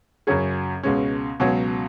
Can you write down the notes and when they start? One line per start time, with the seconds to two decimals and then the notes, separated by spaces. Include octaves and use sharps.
0.27 F#2 C#3 F#3 C#4 G#4
0.83 C#2 B2 G#3 C#4
1.40 C#2 B2 F#3 C#4